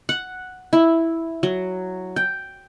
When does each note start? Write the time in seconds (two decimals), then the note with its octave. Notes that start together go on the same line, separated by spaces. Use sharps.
0.09 F#5
0.73 E4
1.43 F#3
2.16 G5